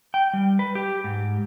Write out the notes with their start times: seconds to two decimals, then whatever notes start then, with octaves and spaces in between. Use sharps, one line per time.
0.14 G5
0.33 G3
0.59 B4
0.75 G4
1.04 G#2